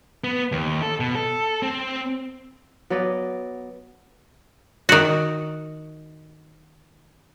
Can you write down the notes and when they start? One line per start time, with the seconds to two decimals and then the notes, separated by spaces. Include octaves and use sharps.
0.24 B3
0.52 D#2
0.82 A4
1.00 B2
1.15 A4
1.63 C4
2.90 F#3 B3 D5 D#5
4.89 D#3 F#4